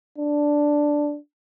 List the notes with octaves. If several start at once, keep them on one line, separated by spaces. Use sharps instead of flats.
D4